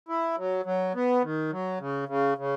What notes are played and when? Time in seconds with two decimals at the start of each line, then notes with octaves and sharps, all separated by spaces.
0.09 E4
0.38 F#3
0.65 F#3
0.95 B3
1.24 D#3
1.51 F#3
1.80 C#3
2.09 C#3
2.38 C#3